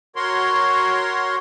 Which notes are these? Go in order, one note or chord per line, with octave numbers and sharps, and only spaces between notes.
F#4 A#4 C#5 C6